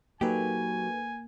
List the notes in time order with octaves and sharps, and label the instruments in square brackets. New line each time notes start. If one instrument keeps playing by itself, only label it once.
[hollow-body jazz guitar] F#3 G4 [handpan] A#3 [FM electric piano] D#4 A4 B4 [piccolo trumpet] G#5